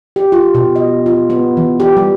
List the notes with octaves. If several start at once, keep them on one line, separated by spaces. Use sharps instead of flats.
G4
F4
B2
D#5
F4
B3
E3
G4
G3